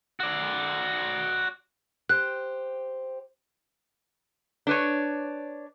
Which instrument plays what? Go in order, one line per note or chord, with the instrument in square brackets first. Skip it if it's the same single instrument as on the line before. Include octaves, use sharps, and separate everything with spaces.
[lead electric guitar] F#4 D5
[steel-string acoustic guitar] G4 C5 [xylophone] F#6
[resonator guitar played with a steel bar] D4 B4 C#5